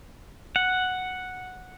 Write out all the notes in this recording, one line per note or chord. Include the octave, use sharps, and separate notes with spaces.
F#5